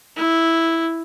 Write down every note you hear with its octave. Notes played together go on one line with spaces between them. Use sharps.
E4